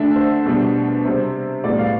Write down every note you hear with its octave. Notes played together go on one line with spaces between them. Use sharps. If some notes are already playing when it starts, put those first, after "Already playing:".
Already playing: D3 A3 D4 E5
C5
B2 G3 D4
C3 G3 C4
A2 G3 B3 D5
F5